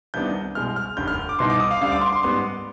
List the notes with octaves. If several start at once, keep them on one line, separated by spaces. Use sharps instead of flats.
C2 C3 D#3 B3 D4 G6
C2 B2 G#3 F6
F6
F1 D#2 D3 G6
F6
D6
C2 B2 B3 D#4 C6
D6
D#6
F5
D2 D3 G3 D4 F5
D6
C6
C6
G#2 G3 B3 C6